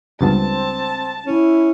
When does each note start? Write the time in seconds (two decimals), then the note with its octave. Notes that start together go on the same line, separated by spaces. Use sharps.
0.21 C#2 G2 B3 C4 A5
1.26 C#4 E4